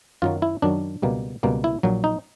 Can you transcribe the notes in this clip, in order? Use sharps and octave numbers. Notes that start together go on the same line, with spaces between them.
F#2 D#3 F#3 F4
E4
F#2 D#3 F#3 D4
C#2 B2 G3 A#3
C#2 B2 G3 A#3
E4
A#1 A#2 F#3
D#4